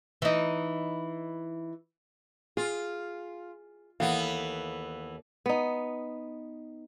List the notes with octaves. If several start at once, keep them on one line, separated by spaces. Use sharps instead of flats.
E3 D#4
F4 G#4
D#2 E3 B3 A4 F5
B3 D#4